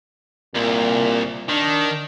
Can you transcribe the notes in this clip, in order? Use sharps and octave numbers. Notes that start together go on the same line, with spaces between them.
C2 A#2
D#3 D4